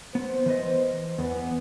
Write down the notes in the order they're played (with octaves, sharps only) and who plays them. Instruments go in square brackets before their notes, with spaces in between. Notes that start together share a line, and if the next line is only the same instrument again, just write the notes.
[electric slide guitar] B3 [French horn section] C5
[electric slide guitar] E3 B4 D#5
[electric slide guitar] E2 [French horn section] B3